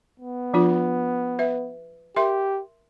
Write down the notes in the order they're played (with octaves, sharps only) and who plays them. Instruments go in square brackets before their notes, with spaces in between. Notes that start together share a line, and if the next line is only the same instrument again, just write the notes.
[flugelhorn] B3
[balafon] F3 D4 F4
B4 E5
[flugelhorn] G4 [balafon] A#4 E5 C6